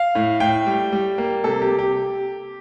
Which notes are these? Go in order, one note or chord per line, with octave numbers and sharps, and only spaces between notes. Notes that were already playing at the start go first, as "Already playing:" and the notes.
Already playing: F5
A2
A2 G5
G3
G3
A#3
C3 A4
G4
C3
G4